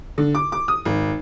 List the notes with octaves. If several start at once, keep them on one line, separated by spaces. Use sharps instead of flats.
D3
D6
D6
D#6
G#1